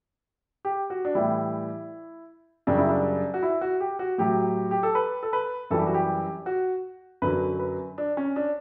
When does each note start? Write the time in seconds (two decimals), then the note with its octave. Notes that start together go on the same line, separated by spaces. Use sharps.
0.65 G4
0.90 F#4
1.05 D4
1.15 A2 E3 G3 E4
2.67 F#2 C#3 G3 D4
2.78 E4
2.89 D4
3.34 F#4
3.43 E4
3.61 F#4
3.80 G4
3.99 F#4
4.18 A2 F#3 G4
4.71 G4
4.83 A4
4.95 B4
5.23 A4
5.33 B4
5.70 F#2 E3 G3 A4
5.79 G4
5.86 F#4
5.94 G4
6.46 F#4
7.22 F#2 D3 F#3 B4
7.59 B4
7.98 D4
8.17 C#4
8.36 D4